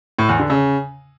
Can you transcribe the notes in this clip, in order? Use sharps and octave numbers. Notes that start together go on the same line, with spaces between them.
A2
E2
D3
C#3